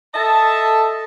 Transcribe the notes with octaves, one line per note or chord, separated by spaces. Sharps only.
A4 D#5 E5 A5